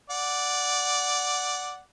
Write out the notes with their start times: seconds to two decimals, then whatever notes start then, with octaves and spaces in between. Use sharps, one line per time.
0.10 D5 F#5